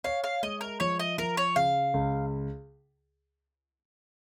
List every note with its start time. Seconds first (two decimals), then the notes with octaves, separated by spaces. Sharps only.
0.04 C#5 F5
0.24 F5
0.43 G#3 D#5
0.61 A#4
0.80 F3 C#5
1.00 D#5
1.18 F3 A#4
1.37 C#5
1.56 C#3 F5
1.94 C#2